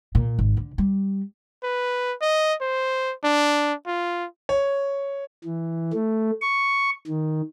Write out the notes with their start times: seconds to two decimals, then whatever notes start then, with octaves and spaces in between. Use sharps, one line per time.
0.15 A#2
0.39 G#1
0.57 D3
0.78 G3
1.64 B4
2.22 D#5
2.61 C5
3.24 D4
3.87 F4
4.49 C#5
5.44 E3
5.93 A3
6.42 C#6
7.08 D#3